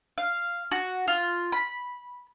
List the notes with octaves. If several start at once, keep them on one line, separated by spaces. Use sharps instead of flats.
F5
F#4
F4
B5